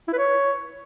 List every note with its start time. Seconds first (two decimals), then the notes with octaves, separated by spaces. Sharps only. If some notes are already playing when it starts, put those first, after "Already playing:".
0.08 E4
0.13 B4
0.18 C#5